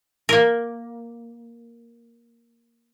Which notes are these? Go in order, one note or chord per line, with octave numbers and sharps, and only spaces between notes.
A#3 A#4